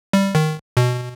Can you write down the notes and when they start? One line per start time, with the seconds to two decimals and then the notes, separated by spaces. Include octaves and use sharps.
0.13 G3
0.35 D#3
0.77 B2